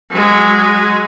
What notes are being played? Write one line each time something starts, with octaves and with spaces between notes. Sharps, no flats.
F#3 G#3